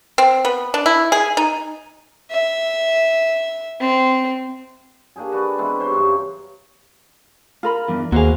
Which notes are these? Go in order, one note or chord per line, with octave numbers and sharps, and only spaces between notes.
C4
B3
D4
E4
G#4
D#4
E5
C4
A#3 D4 G4 G#4
F#4 B4 D5
E3 G#3 B3 C4
G4 C5 C#5
G2 F#3
C#3
F4 A#4 B5
E2 G2
D#2 A#3 F#4 G#4 C5 F5